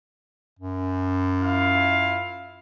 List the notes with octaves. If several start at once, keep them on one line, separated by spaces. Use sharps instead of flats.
F#2
E4 F4 F5